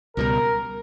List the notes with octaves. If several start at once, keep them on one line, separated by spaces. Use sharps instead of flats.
C#2 B2 G3 A#4